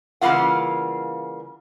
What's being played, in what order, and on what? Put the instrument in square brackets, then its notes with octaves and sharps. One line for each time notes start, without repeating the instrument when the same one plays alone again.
[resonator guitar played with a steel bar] C#3 E3 G3 A#3 F4 F#5